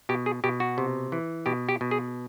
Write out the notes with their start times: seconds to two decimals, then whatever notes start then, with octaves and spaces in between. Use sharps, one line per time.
0.09 B2 G4
0.26 G#4
0.44 B2 G4
0.60 F#4
0.78 C3
1.12 E3
1.46 B2 G4
1.69 G4
1.81 B2
1.91 G#4